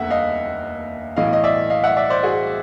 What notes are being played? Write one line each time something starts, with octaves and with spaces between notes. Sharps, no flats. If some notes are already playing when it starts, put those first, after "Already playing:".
Already playing: F1 D#2 D3 E5 F#5
D#5 F5
B1 A2 E3 D#5 F5
D#5
D5 E5
D#5 F5
E5 F#5
D5 E5
C5 D5
F#4 G#4